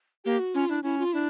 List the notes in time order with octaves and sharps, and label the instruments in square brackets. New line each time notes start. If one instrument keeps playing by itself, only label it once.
[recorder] A#3 [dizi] G4
[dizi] F#4
[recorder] C#4 [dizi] F4
[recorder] D4 [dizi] E4
[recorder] C#4 [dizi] E4
[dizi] F4
[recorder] D4 [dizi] E4